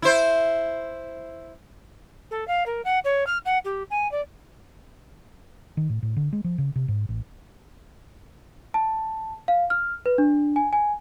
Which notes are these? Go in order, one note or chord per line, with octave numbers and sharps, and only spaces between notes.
E4 C5
A4
F5
A#4
F#5
C#5
F6
F#5
G4
G#5
D5
D#3
A2
A2
D3
G#3
F3
C#3
C3
G#2
A1
A5
F5
F6
B4
D4
G#5
G#5